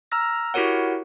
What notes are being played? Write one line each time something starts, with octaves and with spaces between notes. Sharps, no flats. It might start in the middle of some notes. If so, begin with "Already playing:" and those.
A#5 E6 F6 A#6
E4 F#4 G4 A#4 C#5 F#5